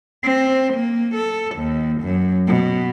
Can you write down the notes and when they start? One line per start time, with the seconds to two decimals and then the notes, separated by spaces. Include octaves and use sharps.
0.24 C4
0.72 A#3
1.15 A4
1.56 D#2
2.02 F#2
2.47 B2